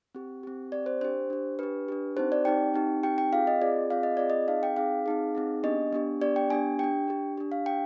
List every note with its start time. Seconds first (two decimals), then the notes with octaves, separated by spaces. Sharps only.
0.15 C4 G4
0.43 C4 G4
0.72 C4 G4 D5
0.86 C5
1.01 D4 G4 C5
1.30 D4 G4
1.59 D4 G4 B4
1.88 D4 G4
2.17 C4 D#4 G4 C5
2.32 D5
2.45 C4 D#4 G4 G5
2.74 C4 D#4 G4
3.03 C4 D#4 G4 G5
3.18 G5
3.33 C4 F4 G#4 F5
3.47 D#5
3.61 C4 F4 G#4 D5
3.90 C4 F4 G#4 F5
4.03 D#5
4.17 C4 F4 G#4 D5
4.30 D#5
4.48 C4 D#4 G#4 F5
4.63 G5
4.77 C4 D#4 G#4 F5
5.06 C4 D#4 G#4
5.35 C4 D#4 G#4
5.64 B3 D4 G4 D#5
5.93 B3 D4 G4
6.21 B3 D4 G4 D5
6.36 G5
6.50 B3 D4 G4 G#5
6.79 D4 G4 G5
7.08 D4 G4
7.37 D4 G4
7.52 F5
7.66 D4 G4 G5